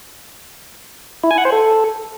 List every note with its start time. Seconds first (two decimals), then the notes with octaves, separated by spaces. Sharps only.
1.24 E4
1.31 G#5
1.38 F#5
1.45 C5
1.52 A4